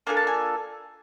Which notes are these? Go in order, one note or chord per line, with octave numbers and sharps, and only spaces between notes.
A#3 D4 F4 A4 G#5
A5
G#5